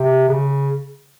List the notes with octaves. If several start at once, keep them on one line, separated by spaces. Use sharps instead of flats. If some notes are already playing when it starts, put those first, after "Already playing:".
Already playing: C3
C#3